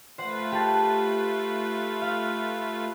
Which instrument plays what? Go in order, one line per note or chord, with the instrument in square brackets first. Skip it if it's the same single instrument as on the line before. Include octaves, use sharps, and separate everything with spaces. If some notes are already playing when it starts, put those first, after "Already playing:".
[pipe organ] A3 F4 B4 [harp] C5 F#5
[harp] G4 A5
F5